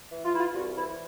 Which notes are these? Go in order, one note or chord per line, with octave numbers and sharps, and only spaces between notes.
E3
F4
E2 E4
F4
C2 F#4
E3 E4